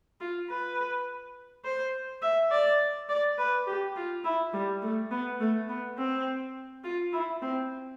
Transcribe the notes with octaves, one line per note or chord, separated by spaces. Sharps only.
F4
B4
C5
E5
D5
D5
B4
G4
F4
E4
G3
A3
B3
A3
B3
C4
F4
E4
C4